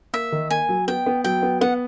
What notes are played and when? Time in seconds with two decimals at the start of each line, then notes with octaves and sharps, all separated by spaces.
0.13 A#3 E5
0.32 D#3
0.50 A#3 G#5
0.69 F#3
0.88 B3 G5
1.06 B3
1.24 F#3 G5
1.43 B3
1.61 B3 F#5